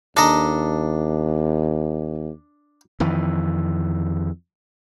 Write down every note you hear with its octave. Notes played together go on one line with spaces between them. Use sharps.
D#2 D4 A4 D#5 A#5
F2 D#3 E3